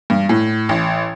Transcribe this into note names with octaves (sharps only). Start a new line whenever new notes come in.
G2
A2
A1